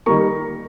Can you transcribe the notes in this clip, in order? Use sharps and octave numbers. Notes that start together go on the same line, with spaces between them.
D#3 G3 A#3 A#5 C#6